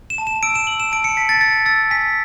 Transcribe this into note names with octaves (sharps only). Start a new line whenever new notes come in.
E7
A5
E7
E6 D7
E7
E6 F#7
E7
A5 D7
C#7
A5 B6
A6
E6 A6
E6 A6
G#5 B6